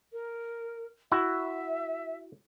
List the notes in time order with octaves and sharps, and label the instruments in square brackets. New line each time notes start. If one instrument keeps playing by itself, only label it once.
[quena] A#4
[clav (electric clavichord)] E4 F#4 [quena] E5